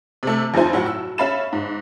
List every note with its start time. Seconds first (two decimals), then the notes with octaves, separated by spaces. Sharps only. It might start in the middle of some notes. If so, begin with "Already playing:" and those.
0.23 C3 A3
0.54 F2 F3 D#4 E4 C5 G#5
0.73 A2 F#3 F#5
0.86 E6
1.18 C#4 E5 F5 B5 A6 E7
1.53 G#2